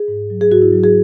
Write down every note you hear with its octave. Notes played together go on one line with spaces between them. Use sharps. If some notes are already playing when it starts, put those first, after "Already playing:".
Already playing: G#4
G#2
F#3
G#4
G#2 F#4
E4
F#3
G#4